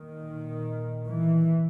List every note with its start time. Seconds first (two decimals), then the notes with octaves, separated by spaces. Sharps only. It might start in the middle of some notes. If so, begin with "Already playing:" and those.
Already playing: A#2 D#3
1.07 E3